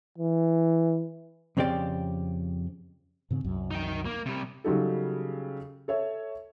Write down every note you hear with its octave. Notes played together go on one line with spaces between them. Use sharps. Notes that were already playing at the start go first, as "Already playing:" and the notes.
E3
F2 C#3 C4 G4 D5
G#2 C#3 C4
C2 F#2
D#4 G5
A#3
C3 G3
C#3 F#3 G3 D#4 G4 A4
A4 C#5 E5